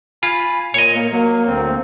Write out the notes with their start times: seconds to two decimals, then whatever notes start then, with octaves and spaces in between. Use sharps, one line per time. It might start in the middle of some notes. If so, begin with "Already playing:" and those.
0.23 F4 G#5 B5
0.74 A#2 C#5 D#5
0.94 A#3
1.12 F#3 A#3
1.47 D2 C4